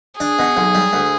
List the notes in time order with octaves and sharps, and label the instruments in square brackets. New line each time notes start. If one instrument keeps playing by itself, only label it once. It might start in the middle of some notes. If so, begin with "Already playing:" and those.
[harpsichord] D4 [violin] G#4
[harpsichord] B2
B1
G3
D2